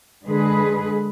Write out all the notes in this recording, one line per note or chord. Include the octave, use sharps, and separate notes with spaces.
D3 G#3 G#4 B4